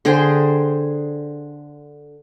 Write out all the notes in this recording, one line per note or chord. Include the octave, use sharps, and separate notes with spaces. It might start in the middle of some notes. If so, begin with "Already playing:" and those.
D3 G#4 C5 G5